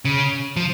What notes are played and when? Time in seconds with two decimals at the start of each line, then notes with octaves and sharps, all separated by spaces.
0.05 C#3
0.56 F3